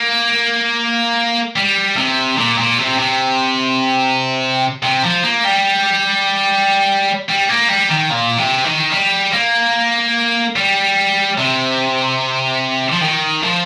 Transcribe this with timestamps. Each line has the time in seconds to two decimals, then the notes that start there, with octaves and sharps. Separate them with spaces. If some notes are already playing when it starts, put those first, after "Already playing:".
Already playing: A#3
1.56 G3
1.97 C3
2.38 A#2
2.58 A#2
2.78 C3
2.98 C3
4.83 C3
5.03 F3
5.23 A#3
5.44 G3
7.29 G3
7.49 A#3
7.69 G3
7.90 D#3
8.11 A#2
8.38 C3
8.64 D#3
8.92 G3
9.33 A#3
10.56 G3
11.38 C3
12.92 F3
13.02 D#3
13.43 F3